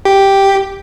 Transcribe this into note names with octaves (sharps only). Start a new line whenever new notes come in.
G4